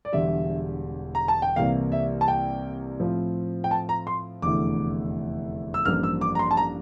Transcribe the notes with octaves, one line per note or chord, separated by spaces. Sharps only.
D5
E1 E2 D3 G3 E5
A#5
A5
G5
C2 C3 E3 A#3 F5
E5
A5
G5
A2 F3 C4 F4
G5
A5
A#5
C6
F1 E2 D3 A3 E4 D6
E6
A1 G2 F3 A#3 D4 F6
E6
D6
A#5
C6
A5
A#5